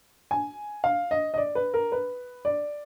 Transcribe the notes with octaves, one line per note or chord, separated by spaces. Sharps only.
G#5
F5
D#5
D#5
D5
B4
A#4
B4
D5